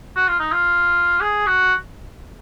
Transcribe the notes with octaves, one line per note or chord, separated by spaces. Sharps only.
F#4
F4
D#4
F4
G#4
F#4